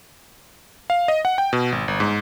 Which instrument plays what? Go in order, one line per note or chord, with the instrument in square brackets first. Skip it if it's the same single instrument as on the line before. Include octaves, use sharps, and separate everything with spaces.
[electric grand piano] F5
D#5
F#5
G5
B2
G#1
G1
G#2